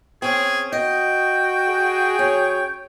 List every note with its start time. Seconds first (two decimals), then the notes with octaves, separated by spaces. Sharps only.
0.22 C4 C#4 G#4
0.72 F#4 D#5 G5
1.69 G#4
2.19 F#2 C#5